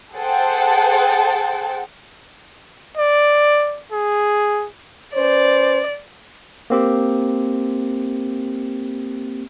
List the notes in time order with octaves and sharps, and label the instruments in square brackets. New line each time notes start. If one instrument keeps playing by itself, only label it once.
[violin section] G#4 A4 C5 F#5 G5 A5
[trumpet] D5
G#4
[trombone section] C#4 B4 C5 [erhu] D5
[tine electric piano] A#3 C4 G4